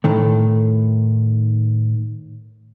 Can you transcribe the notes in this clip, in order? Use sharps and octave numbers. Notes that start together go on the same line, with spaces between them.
A2 D#3 A3